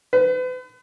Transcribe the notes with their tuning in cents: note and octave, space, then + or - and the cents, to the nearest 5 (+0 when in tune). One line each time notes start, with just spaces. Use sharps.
B4 +40